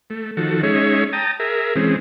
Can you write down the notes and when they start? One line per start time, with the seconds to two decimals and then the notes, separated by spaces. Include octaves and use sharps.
0.10 A3
0.37 D#3 F3 F#4 A4
0.63 G#3 C#4 D#4 G#4 C#5 E5
1.13 G5 A5 A#5 D#6
1.40 G#4 A#4 E5
1.76 E3 G#3 C4 C#4 G#4